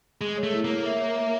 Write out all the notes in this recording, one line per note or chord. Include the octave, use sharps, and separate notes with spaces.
G#3 G#4
C#5
A3
E4
A#3 C#5
E5
C#5
E5